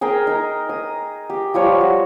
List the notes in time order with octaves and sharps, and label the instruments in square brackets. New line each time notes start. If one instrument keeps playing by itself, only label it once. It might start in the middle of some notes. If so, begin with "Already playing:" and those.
[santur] G#4 A#4 G5 G#5
D#4 A#4
D#6
G4
F3 G3 C#5
F#4